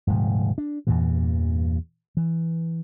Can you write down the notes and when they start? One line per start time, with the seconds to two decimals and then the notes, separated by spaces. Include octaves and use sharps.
0.07 D#1 G#2 C3 F3
0.58 D4
0.87 E2 G2 A#2 E3
2.17 E3